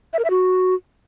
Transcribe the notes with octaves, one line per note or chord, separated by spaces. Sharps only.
E5
A#4
E5
F#4